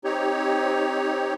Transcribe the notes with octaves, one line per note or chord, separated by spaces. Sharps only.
C4 D#4 G4 C#5